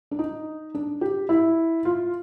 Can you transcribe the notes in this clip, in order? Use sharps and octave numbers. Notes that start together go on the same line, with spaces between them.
D4
D#4
D4
G4
E4
F4